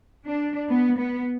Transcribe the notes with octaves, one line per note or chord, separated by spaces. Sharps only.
D4
B3
B3